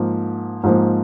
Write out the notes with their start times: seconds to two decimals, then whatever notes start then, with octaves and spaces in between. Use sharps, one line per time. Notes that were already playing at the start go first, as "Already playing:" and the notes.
Already playing: G#2 F3 A#3
0.63 G#2 F3 A#3